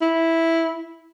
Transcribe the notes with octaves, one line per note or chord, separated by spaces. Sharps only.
E4